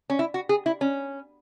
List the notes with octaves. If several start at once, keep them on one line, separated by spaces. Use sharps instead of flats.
C#4
E4
F#4
G#4
E4
C#4